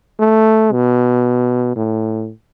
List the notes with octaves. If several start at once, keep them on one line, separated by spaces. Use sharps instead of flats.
A3
B2
A2